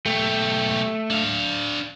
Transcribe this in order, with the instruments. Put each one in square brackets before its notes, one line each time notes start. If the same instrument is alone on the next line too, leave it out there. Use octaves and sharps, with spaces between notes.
[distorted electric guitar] B1 G4 [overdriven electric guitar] A3
[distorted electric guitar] D4 F5